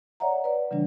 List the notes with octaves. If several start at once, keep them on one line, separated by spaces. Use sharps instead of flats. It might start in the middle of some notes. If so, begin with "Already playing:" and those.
C#5 D5 E5 F#5 A#5
B4 D5
C#3 E3 G3 D4